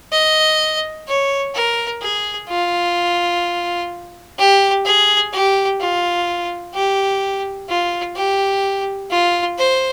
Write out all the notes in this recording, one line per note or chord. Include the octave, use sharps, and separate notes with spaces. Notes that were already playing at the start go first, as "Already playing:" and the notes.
D#5
C#5
A#4
G#4
F4
G4
G#4
G4
F4
G4
F4
G4
F4
C5